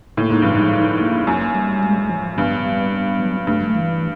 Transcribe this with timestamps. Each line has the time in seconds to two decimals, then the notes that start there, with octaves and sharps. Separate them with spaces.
0.17 A2 A#3
0.30 G#2
0.42 G2 F3
0.55 G#2
0.73 D#4
1.00 A#3
1.27 F#2 A#3
1.55 G3
1.83 G#3
2.10 F3
2.37 G2 B3
2.65 G3
2.92 B3
3.20 F#3
3.47 G2 A3
3.75 E3